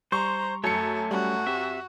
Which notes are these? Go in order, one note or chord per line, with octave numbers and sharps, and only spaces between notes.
G3 C5 A#5 C6 C#6
F#2 A3 A4 C#5 C#7
G3 C#4 F#4
C4 G4 E5